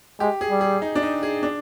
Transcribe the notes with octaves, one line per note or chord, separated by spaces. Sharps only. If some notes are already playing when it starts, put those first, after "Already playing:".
G#3 G4
G#4
G3
G#4
D#4
D4
D#4
G#4
D4